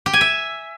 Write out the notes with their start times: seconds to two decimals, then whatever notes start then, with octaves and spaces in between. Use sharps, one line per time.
0.06 G4
0.13 G#5
0.21 E5